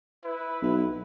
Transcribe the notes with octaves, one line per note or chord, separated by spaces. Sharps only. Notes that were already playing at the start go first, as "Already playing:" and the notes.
E4 B4
B1